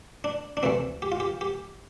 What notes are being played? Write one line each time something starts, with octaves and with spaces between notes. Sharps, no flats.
D4
D4
D2 C3 E3 A3 C4
G4
F4
G4
G4